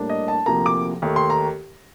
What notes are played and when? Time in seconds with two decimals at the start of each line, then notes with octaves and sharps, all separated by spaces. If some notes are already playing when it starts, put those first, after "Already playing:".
Already playing: A2 G3 A#3 D4
0.10 D#5
0.28 A5
0.46 D2 C3 F3 A#3 A#5
0.66 D6
1.02 D#2 D#3 A3
1.16 C6
1.30 A#5